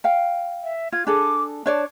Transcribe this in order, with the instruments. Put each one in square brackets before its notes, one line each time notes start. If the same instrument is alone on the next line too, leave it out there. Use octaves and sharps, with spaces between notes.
[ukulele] F5 G5
[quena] E5
[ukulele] F4 [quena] G#6
[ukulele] D4 G#4 A4 [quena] D6
[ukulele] D4 C#5 D5 [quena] A5